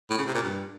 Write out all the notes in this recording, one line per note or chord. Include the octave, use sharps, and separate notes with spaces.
A2
C#3
C3
A#2
G2